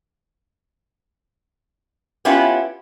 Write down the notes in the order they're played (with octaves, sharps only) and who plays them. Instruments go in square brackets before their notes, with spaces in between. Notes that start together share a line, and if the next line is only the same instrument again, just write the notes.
[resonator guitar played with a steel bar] B3 C#4 E4 F4 G4